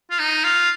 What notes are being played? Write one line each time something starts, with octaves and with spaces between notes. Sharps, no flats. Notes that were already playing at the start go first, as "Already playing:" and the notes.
F4
D#4
F4